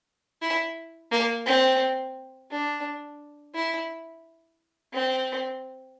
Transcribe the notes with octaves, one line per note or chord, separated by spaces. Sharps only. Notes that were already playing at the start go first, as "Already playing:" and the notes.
E4
A#3
C4
D4
E4
C4